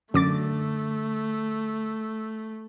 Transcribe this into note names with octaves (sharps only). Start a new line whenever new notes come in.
F#2 D3 A3 D6 A6